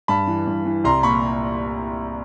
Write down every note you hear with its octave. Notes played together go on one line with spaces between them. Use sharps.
G2 A5 B5
E3
G2
E3
C2 A#5 C6
A#2 B5 C#6